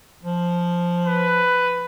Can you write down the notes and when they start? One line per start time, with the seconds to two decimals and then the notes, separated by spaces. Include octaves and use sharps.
0.23 F3
1.06 B4